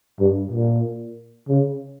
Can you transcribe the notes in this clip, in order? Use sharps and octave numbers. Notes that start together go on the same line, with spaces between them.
G2
A#2
C#3